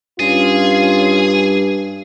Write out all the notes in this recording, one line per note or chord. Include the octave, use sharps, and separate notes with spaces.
G2 C#4 F4 G#4